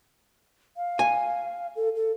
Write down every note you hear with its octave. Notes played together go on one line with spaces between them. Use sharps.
F5
G#5
A4
A4